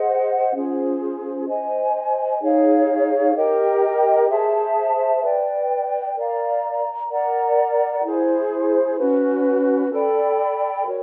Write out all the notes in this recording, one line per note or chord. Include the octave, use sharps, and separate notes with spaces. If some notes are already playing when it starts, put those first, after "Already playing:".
Already playing: G#4 C5 D#5 F#5
C#4 F4 G#4 C5
C5 D#5 G#5
D#4 G#4 C#5 F5
G4 A#4 D#5 G5
G#4 C5 E5 A5
B4 D5 G5
A#4 D5 F5 A#5
A#4 D5 F#5 A#5
E4 G#4 C5
C#4 F#4 B4
A4 D5 G5 B5
F#4 A#4 C#5